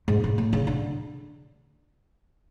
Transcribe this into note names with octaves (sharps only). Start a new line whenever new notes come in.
G#2
A2
A2
C#3
D3